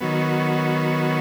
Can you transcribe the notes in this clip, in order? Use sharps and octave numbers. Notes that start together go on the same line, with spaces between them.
D#3 F#3 B3